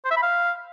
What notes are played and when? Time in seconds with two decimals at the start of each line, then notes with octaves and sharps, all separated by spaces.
0.05 C5
0.11 E5
0.17 B5
0.22 F5